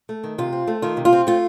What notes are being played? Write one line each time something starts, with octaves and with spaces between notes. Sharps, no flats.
A3
D#3
C3 F4
C4
A3
D#3 F4
C3
F4
C4
A3 F4